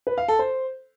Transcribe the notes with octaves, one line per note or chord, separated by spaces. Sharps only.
B4
F5
A4
C5